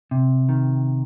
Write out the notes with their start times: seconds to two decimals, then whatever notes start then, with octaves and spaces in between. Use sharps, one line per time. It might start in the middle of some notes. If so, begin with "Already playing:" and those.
0.11 C3
0.49 D#3